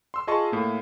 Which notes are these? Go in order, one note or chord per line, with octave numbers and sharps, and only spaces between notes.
C6 E6
F4 G#4 D#5 A5 C6 C#6
A2 A#3